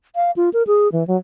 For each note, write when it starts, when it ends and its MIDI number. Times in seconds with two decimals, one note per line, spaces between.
0.15 0.31 77
0.36 0.49 65
0.53 0.63 70
0.67 0.91 68
0.92 1.06 52
1.07 1.17 54